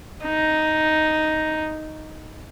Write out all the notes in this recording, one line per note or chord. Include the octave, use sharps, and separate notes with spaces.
D#4